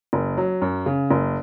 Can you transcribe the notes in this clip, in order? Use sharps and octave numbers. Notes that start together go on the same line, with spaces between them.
F#1
F#3
F#2
C#3
F#1